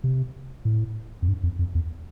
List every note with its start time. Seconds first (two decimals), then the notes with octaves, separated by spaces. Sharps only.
0.04 C3
0.65 A2
1.22 F2
1.28 G2
1.43 F2
1.59 F2
1.75 E2